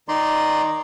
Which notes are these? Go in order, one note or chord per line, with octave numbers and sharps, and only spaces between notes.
D#3 D#4 D5 A#5 C6